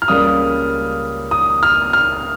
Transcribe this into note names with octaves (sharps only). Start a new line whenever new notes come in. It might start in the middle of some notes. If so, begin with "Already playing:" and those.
F6
C#2 C#3 G3 A#3 D#6
D#6
F6
F6